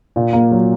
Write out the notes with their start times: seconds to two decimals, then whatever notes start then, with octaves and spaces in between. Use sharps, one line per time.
0.16 A#2
0.33 A#3
0.51 F#3